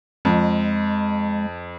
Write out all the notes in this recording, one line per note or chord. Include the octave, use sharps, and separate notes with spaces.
F2 G#3